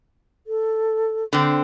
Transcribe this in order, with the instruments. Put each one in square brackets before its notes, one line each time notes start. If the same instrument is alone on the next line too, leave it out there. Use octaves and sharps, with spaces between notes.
[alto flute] A4
[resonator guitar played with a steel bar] D3 C4